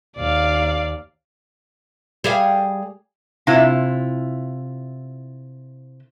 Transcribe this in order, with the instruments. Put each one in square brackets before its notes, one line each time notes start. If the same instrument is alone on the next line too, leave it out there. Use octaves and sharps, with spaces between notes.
[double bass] D#2 [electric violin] D5 F5
[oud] G3 G#4 F5
[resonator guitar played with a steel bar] C3 E4 F4